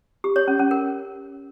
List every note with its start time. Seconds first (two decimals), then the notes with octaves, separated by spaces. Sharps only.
0.24 G4
0.36 C#5
0.48 C#4
0.59 C#4
0.71 A#4